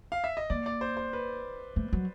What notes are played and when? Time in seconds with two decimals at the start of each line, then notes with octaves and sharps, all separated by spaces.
0.12 F5
0.24 E5
0.37 D#5
0.50 A#3 D5
0.66 D5
0.81 C5
0.97 C5
1.13 B4
1.76 A3
1.93 F#3